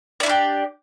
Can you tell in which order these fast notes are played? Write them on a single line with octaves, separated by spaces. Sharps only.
D5 E4 D4 G4